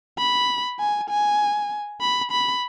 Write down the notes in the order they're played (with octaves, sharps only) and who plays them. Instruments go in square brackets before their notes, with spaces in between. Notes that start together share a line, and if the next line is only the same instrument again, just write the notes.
[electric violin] B5
G#5
G#5
B5
B5